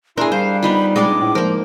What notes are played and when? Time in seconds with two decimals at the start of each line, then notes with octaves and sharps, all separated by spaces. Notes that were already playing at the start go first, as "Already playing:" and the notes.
0.18 D4 E4 G#4 A#4 C6
0.32 G3 C5 F5
0.63 B3 D#4 F4 B5
0.96 G#3 C4 D4 D6
1.21 A2
1.35 F3 A#3 A#4